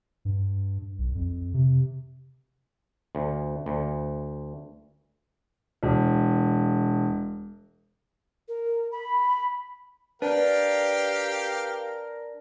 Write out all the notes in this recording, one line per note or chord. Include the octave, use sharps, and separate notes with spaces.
G2
B1
F2
C3
D2
D2
E1
A#4
B5
D4 G4 A#4 B4 F5 G5